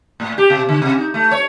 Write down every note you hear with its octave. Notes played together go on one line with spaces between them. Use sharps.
A2
G4
B2
D3
C3
D#4
A3
C#5